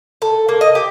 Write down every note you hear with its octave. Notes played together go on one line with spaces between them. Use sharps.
A4
A#3
D#5
G4